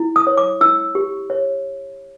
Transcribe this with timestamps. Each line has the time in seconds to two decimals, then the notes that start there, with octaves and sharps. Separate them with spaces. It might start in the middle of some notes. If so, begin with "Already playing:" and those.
Already playing: E4
0.16 D#6
0.27 C#5
0.38 D6
0.61 E4 E6
0.95 G4
1.30 C#5